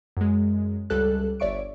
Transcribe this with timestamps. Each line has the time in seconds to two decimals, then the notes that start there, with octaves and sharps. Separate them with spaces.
0.17 F#2 G#3
0.90 C#2 G3 A4 F#6
1.40 G1 C#5 D5 E5 C#6 D7